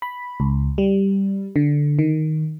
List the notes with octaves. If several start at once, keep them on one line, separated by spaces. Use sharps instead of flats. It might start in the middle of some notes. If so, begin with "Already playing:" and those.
B5
C#2
G3
D3
D#3